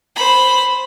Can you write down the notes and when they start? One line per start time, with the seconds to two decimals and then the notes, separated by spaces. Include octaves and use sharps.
0.16 C5 B5